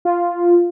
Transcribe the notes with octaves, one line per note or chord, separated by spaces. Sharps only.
F4